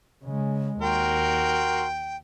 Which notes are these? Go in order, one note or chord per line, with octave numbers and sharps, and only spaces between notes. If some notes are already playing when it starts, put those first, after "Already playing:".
C#3 G#3
D#2 F#4 A#4 G5 C6